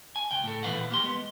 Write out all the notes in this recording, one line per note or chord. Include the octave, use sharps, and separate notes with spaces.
G#5
C#2 G5
A2 A4
A#2 E3 A#3 B4 F5 F#5
A#3 G4 C6
G#3 B3